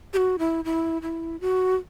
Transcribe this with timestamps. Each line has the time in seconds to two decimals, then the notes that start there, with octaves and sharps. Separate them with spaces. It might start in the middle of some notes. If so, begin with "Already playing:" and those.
0.13 G4
0.17 F#4
0.39 E4
0.65 E4
1.02 E4
1.41 F#4